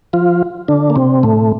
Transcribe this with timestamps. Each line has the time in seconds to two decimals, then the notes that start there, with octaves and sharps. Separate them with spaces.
0.13 F3 F4
0.68 D3 D4
0.90 A#3
0.96 C3 C4
1.23 A2 A3